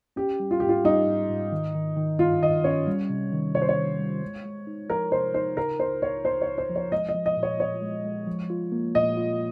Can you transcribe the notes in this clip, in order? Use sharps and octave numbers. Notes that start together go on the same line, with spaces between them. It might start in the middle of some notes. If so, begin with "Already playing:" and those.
C#4 G4
G3
F4
G#2 G4
F4
G3 D#4
G#2
G#2
D#3
D#3
D#3
G2 F4
D#3 D#5
C#4 C#5
G3
C3
D#3
C3 C#5
C5
C#5
D#3
G3
G#3
G#3
D#4
F3 A#4
C3 C5
D#4 C5
C#3 A#4
C#2 C5
C#2 C#5
C#2 C5
C#5
C#2
C5
F3
C#5
G#3 D#5
D#5
F3
D#5
A#2
C#5
A#2 C#5
G#3
G#3
F3
F4
A#3
A#2 D#5
F4